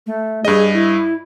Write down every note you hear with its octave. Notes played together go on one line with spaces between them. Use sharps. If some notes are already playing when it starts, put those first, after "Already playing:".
A3
G2 G#4 D#5
E4